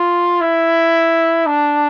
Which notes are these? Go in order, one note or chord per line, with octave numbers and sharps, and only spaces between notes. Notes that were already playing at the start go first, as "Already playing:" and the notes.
Already playing: F4
E4
D4